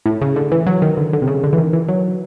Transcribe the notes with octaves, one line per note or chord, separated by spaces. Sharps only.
A2
C#3
D3
E3
F#3
D#3
D3
D3
C3
C#3
D3
E3
D#3
E3
F#3